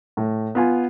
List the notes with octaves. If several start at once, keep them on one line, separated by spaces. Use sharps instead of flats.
A2
B3 F4 G#5